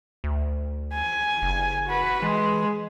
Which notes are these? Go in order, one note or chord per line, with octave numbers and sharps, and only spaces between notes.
D2
G#5
F#1
F#4 B4
E3 G#3